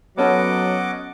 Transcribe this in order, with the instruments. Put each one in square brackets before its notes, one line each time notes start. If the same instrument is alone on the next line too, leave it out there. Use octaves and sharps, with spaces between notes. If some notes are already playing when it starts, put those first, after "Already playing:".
[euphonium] F#3 [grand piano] B3 C#4 A4 [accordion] D#5 F#5 D6